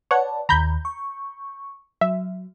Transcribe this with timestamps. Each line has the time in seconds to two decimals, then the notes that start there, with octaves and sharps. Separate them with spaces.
0.11 B4 C#5 D5 F#5 A5
0.49 D#2 D#3 A#5 B5 G6
0.85 C#6
2.01 F#3 E5